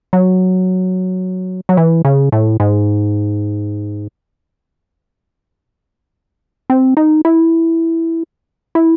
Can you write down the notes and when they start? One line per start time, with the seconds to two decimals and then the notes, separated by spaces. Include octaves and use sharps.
0.13 F#3
1.69 F#3
1.77 E3
2.05 C#3
2.32 A2
2.60 G#2
6.70 C4
6.97 D#4
7.25 E4
8.75 E4